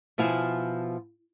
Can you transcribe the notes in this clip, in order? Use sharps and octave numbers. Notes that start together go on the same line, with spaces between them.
B2 F3 E4 F5 G#5